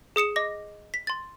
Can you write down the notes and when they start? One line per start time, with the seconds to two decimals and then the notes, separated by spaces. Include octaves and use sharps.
0.16 G#4 D#6 C#7 E7
0.36 D#5 D6 A#6
0.94 B6
1.07 C6 A6